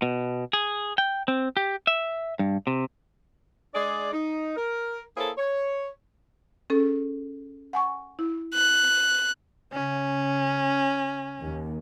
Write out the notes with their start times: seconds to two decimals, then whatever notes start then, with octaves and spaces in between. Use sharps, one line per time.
0.02 B2
0.53 G#4
0.98 G5
1.28 C4
1.57 G4
1.87 E5
2.39 G2
2.67 C3
3.74 G#3 D4 G#4 D5
4.13 D#4
4.57 A#4
5.17 A#3 E4 G#4 A4 C5 C#5
5.38 C#5
6.70 C#4 G#4 A4
7.73 F#5 G#5 C#6
8.19 E4
8.54 F#6
9.73 C#3 C#4
11.42 D#2